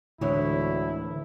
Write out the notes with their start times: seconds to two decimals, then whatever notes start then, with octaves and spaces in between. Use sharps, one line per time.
0.21 D2 A2 D3 E3 G#3 E4 C5 C#5